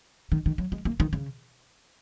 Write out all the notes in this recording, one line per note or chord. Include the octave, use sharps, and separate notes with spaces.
D#3
D#3
F#3
G#3
A#3
D#3
C#3